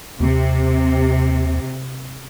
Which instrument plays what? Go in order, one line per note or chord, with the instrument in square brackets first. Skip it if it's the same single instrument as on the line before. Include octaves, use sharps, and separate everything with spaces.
[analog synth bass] D#2 [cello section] C3